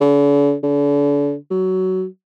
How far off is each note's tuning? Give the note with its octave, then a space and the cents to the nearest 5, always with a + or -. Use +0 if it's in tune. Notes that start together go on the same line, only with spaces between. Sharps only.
D3 -45
D3 -40
F#3 +15